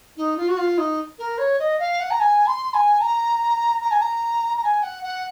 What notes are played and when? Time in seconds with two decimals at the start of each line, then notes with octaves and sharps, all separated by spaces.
0.17 D#4
0.37 F4
0.49 F#4
0.57 F4
0.78 D#4
1.19 A#4
1.38 C#5
1.59 D#5
1.79 F5
2.00 F#5
2.10 A#5
2.20 G#5
2.46 C6
2.74 G#5
3.00 A#5
3.82 A#5
3.91 G#5
4.00 A#5
4.56 A#5
4.64 G#5
4.83 F#5
5.03 F#5